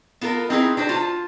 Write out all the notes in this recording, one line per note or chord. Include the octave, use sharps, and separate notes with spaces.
B3 F4 A4 A#4
C4 D#4 E4 G#4 B4
D4 F#4 B4 C5
F4 A5